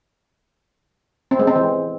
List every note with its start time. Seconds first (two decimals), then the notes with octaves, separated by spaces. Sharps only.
1.31 C4
1.39 G#3
1.47 C4
1.56 E3